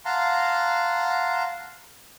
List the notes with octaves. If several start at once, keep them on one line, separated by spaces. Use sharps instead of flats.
F5 F#5 A5 A#5 C6